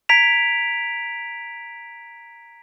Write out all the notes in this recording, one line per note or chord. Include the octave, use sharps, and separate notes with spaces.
A#5 G#6 B6 D7 F7